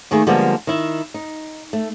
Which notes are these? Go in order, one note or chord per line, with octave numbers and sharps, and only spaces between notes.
D#2 D#3 A3 G#4
D3 F3 G3 G#3 A#3 B3
D#3 E4
D#4
A3